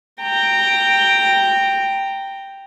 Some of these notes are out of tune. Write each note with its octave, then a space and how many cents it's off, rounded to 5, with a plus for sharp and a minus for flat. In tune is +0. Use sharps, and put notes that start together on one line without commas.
G5 +0 A#5 -15